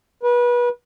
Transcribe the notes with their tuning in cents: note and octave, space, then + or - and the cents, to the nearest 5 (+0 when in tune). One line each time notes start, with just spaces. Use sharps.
B4 -30